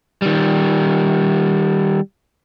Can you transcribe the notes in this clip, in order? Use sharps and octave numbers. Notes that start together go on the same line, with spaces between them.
D#3 G3